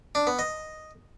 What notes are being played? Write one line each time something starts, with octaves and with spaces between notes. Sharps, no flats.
D4
B3
D#5